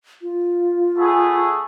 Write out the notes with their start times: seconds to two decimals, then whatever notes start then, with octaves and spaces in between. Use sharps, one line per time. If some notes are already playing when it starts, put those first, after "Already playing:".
0.22 F4
0.98 A3 B3 G#4